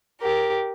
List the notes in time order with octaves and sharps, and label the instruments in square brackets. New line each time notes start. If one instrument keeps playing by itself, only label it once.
[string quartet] G4 A#4